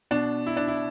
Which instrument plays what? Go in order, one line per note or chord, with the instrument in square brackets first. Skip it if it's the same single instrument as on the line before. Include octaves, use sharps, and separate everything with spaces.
[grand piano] B2 D4
E4
D4
E4